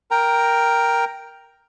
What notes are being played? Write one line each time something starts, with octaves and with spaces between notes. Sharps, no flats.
A#4 G5 A#5